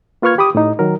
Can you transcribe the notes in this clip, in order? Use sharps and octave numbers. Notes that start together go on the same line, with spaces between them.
A#3 F4 B4 C#6 F6 G#6
G4 B5 D6 D#6
A2 D#4
D#3 F#3 A#4